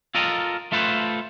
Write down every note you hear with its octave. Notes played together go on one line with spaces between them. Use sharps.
F4 A4 A#4 D#5
A3 F4 A4 B4 C5